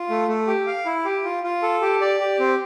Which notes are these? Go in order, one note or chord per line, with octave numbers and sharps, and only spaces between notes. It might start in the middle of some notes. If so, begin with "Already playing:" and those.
Already playing: F4
A3
A3
G4
F5
E4
G4
F4
F4
A4
G4
D5
G4
C4